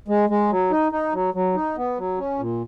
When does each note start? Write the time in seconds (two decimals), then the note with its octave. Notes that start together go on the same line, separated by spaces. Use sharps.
0.08 G#3
0.29 G#3
0.50 F#3
0.71 D#4
0.92 D#4
1.13 F#3
1.34 F#3
1.55 D#4
1.77 B3
1.98 F#3
2.18 C#4
2.39 A#2